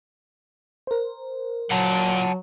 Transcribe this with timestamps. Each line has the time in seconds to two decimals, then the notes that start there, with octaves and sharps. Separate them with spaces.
0.87 A#4 C5
1.71 A#2 F#3 F#5 A5